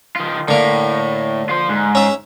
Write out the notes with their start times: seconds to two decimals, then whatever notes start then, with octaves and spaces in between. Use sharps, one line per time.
0.16 D#3 F4
0.48 A2 D3 A#3
1.49 F4 C5
1.69 G#2
1.95 C#4 E5